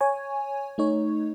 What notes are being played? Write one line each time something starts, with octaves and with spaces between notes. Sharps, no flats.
C#5 G#5
A3 D#4 C#5